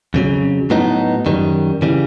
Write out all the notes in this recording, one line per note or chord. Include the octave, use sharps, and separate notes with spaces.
F2 C#3 F#3
A2 F#3 B3 D#4
F#2 D#3 G3
C#3 E3 G3